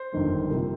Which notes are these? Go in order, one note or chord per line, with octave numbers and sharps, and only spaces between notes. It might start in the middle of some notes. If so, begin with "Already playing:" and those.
Already playing: C5
G1 F2 D#3 A#3
C2 C3 F3 A#3